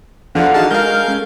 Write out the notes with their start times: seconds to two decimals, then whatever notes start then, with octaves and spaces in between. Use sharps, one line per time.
0.35 E2 D3 F3 D4 F5 F#5 A#5
0.54 D#4 F#4 G#4 F5 A5
0.71 G#3 A#4 F5 A#5 F6 G6
1.07 C#4 A4